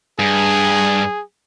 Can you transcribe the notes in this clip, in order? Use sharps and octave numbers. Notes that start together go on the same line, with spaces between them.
G2 G#4